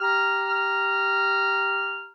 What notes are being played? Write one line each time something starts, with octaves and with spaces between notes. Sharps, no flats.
G4 A#5 F6